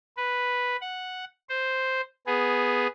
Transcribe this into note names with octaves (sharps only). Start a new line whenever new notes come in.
B4
F#5
C5
B3 G#4